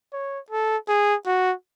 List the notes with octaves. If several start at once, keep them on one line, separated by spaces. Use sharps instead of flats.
C#5
A4
G#4
F#4